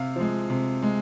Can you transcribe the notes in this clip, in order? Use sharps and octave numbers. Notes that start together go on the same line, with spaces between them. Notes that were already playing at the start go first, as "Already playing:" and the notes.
Already playing: C3 F5
F3 G#3
C3
G#3